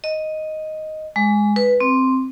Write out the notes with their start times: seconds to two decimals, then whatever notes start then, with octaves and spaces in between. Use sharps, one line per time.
0.04 D#5
1.16 G#3
1.56 B4
1.80 C4